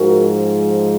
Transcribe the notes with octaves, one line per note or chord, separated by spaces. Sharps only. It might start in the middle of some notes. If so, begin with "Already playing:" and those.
Already playing: G#2 F3 G#3 F#4 A#4